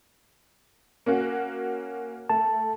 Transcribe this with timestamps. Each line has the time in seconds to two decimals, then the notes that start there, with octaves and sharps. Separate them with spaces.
1.06 A#3 C#4 F#4
2.30 A3 A5